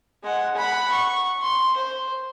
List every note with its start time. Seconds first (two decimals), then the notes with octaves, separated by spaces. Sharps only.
0.23 G#3 F#5
0.56 F#5 B5
0.92 C#6
1.41 C6
1.77 C5